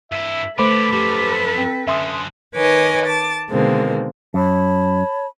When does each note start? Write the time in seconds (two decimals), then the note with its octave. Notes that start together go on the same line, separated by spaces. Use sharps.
0.12 G2 E4 E5
0.58 D3 A3 B3 A4 B4 C5 B5 D6
0.93 F#2 F3 G4
1.57 C4
1.87 F#2 D3 C#4 E5 C6 D#6
2.55 D#3 B4 C#5 D#5 G#5 D6
3.04 A5 D6 A6
3.50 B2 D3 D#3 G#3 A#3 C4
4.34 F#2 C#5 A5 B5